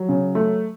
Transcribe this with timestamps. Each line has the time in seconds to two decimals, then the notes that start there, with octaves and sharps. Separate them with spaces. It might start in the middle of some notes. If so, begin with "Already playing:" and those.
Already playing: F#3
0.09 C#3
0.35 A3